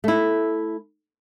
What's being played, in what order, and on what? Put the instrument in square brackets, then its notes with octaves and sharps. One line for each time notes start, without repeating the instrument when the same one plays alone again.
[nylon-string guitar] A3 E4